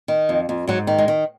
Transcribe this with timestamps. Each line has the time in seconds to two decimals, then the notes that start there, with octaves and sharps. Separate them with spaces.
0.08 D#3
0.29 F2
0.49 F2
0.68 G#2 F#3
0.87 D#3
0.98 G#3
1.08 D#3